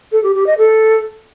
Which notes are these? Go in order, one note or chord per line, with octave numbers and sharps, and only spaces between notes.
A4
G4
G4
D#5
A4